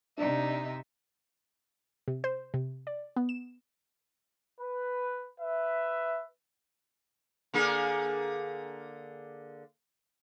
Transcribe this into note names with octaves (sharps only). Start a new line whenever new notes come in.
C3 D4 D#4 D5 E5
C3
C5
C3
D5
B3
E7
B4
B4 E5
D3 A#3 G#4